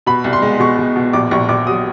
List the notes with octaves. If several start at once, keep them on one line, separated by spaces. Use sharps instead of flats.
B2 B5
C2
C6
G#3
B2 C#6
B2
B2
A#1 D6
A#1 C#6
A#1 D6
F#3 D#6